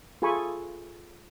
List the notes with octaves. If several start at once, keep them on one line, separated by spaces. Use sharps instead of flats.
F4 G#4 A4 G#5 B5 C#6